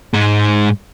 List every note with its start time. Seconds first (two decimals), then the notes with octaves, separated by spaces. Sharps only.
0.14 G#2 G#3